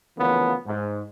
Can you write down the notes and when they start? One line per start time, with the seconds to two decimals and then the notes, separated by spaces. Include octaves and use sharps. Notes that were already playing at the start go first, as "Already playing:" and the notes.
0.17 D2 C#3 E3 F3 A#3 B3
0.66 G#2